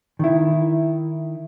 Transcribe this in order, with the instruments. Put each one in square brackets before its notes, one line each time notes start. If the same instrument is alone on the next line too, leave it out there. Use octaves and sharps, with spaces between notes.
[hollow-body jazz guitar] D#3 E4